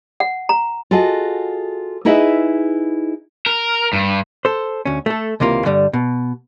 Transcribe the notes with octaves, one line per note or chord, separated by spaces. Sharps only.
F#5
A#5
F4 F#4 G#4 A4 D#5
D#4 E4 G#4 B4 D#5 E5
A#4
G2
A4 C5
D2 C#4
A3 A4
C#2 C3 E3 A#3 F4
G2 D3 G3
B2